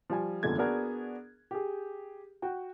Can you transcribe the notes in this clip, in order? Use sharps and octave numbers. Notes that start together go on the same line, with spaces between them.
F3 G3 G#5
F#1 E2 D3 F3 A3 G#6
B3 D4 F#4 G#4 A#4
G4 G#4
F#4 G5